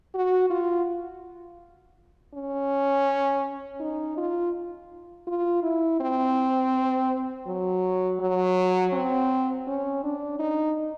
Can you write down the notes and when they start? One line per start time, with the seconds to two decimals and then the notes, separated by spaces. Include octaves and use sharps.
0.14 F#4
0.50 F4
2.34 C#4
3.80 D#4
4.17 F4
5.27 F4
5.63 E4
6.00 C4
7.47 F#3
8.20 F#3
8.93 C4
9.67 C#4
10.03 D4
10.39 D#4